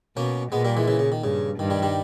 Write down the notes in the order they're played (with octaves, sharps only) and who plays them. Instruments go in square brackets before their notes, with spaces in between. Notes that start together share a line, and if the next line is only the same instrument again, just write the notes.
[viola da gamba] B2 [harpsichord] A#3 C#4
[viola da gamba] A#2 [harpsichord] G#3 B3
[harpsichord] G3 A#3
E3 G#3
C#3 E3
C#3
D#3
[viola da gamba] G2 [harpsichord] C#3
[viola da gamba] G2 [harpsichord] D#3
[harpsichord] D#3 G3
D#3 G3